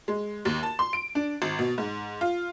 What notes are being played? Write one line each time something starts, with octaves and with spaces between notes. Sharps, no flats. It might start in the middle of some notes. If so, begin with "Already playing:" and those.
G#3
D#2
A5
C6
D7
D4
G#1
B2
G#2
F4